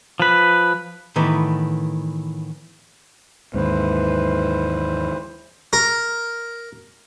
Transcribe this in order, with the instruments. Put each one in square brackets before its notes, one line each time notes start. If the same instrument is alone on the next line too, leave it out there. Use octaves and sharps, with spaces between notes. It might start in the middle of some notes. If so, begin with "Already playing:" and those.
[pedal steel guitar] F3 B4
[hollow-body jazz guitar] A2 D#3 E3 B3
[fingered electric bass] D#2 G#2 [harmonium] E3 B4 C5
[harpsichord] A#4